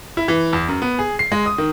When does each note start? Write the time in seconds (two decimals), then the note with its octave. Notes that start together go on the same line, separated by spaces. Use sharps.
0.17 E4
0.28 E3
0.53 E2
0.68 F#2
0.82 B3
0.99 G#4
1.19 C7
1.32 G#3
1.46 D#6
1.58 D#3